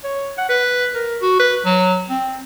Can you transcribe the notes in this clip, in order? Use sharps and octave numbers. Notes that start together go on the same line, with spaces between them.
C#5
F#5
B4
A#4
F#4
B4
F#3
C4